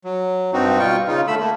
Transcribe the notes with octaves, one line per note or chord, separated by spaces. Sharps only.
F#3
G2 C4 D#4 F#4
B2 G3 F4 G5 C#6
C#3 D#4 F4
D3 A3 B5 E6
A3 A#3